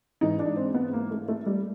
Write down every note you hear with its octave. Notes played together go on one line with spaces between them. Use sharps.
G#2 E3 D#4
D4
C4
B3
A#3
A3
A3
G3